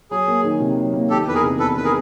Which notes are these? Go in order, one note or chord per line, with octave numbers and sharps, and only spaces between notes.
F#3 G#4
A#3
D#3
C3
F#3
A#3
D#3 G4 A4
E2 B4
G#4 A#4
C3
E2 A4 B4
D#3 B4
G#4 A#4